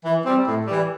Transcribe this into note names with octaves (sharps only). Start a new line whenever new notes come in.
E3
G3 C4
A2
E3 G3